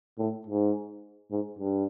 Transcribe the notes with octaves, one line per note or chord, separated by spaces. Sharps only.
A2
G#2
G#2
G2